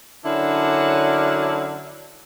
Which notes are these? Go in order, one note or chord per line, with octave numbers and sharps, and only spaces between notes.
D3 F#3 C#4 D4 E4 A#4